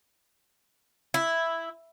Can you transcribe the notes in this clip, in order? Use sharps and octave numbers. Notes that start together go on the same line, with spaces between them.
E4